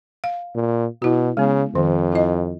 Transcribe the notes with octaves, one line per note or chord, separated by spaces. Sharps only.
F5
A#2
B2 E4 F#4
C#3 G#3 B3
F2 D#3
E4 D#5